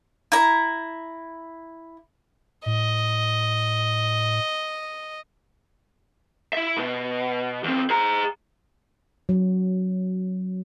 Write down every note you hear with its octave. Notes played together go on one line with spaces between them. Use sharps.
E4 A#5
A2 D#5
E4 E5
B2
E2 C4
G#4 A#5
F#3